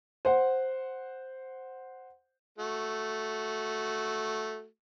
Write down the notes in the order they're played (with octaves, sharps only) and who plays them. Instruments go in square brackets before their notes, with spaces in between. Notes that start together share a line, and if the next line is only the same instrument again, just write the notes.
[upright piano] C5 F#5
[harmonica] A3 F#4